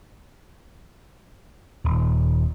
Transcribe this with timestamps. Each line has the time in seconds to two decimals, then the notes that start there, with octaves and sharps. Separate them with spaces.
1.85 D#1